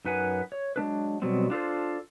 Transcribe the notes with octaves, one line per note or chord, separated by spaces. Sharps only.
F#2 D#4 B4 F#5 G#5
C#5
F#3 G#3 D4 B4
B2 F#3 G3 B3 C4
D4 F4 A4 C5